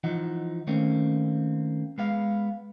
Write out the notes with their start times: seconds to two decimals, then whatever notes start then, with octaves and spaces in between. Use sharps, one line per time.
0.04 E3 F3 D#4 F#5
0.67 D#3 A3 A#3 C4 C#4
1.98 G#3 B3 F5